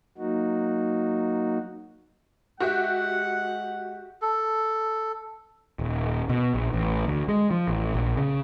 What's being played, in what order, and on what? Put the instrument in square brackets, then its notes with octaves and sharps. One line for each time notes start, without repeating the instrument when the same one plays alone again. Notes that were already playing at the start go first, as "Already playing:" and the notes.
[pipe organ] F#3 A#3 D#4 F#4
[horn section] G#3 F#5 [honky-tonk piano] F#4 G4 E5
[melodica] A4
[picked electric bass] D#1
B2
A#1
A1
D2
G#3
F3
A1
A#1
C#3